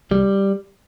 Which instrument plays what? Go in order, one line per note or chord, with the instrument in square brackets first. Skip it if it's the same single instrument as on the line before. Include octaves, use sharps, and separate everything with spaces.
[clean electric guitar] C2 G3